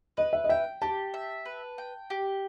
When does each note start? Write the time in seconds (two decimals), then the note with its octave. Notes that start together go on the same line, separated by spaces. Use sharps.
0.17 B4 D#5
0.33 E5
0.44 D#5
0.49 E5 G5
0.82 G4 A5
1.14 E5
1.45 B4
1.78 G5
2.10 G4